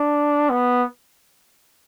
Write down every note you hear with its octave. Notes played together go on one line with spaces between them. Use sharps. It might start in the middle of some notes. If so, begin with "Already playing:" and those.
Already playing: D4
B3